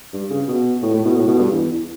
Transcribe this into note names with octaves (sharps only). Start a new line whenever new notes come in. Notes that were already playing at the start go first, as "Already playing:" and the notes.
G2
C#3
B2
A2
A2
B2
A2
B2
G2
E2
E2